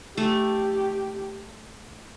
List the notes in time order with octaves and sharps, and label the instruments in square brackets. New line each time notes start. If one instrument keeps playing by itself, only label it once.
[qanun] A3 [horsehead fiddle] G4